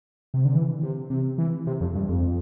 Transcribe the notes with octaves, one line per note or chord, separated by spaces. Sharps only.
C3
D3
E3
C3
C3
E3
C3
F2
G2
F2